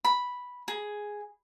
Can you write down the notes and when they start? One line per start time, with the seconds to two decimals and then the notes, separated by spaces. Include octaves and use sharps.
0.05 B5
0.68 G#4